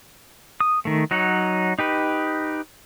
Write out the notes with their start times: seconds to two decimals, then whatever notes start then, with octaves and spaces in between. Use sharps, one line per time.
0.60 D#6
0.85 D#3 A3
1.11 F#3 D#4 C#5 F#5
1.79 D#4 G4 B4